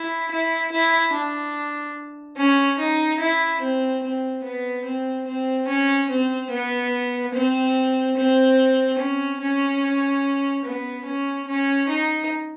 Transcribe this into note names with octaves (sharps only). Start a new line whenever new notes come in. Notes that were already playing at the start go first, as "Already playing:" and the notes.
Already playing: E4
E4
E4
D4
C#4
D#4
E4
C4
C4
B3
C4
C4
C#4
C4
B3
C4
C4
C#4
C#4
B3
C#4
C#4
D#4